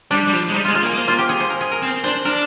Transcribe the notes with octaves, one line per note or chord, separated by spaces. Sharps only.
G3 D4
G3
F3
G#3
G3 D#4
G#3 F4
F4
A#3 G#4
C5
F4
G4
G#4
C5
A#4
G#4
A#4
C4
D4 C5
D4 A#4